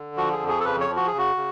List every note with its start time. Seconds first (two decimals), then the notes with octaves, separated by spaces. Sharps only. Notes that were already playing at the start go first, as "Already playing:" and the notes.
Already playing: D3
0.17 F3 F#4
0.33 G#4
0.41 F2
0.48 G#4
0.60 A4
0.65 C#3 B4
0.81 C#5
0.89 F3
0.96 F#4
1.07 G#4
1.12 C#3
1.18 F#4
1.36 C#3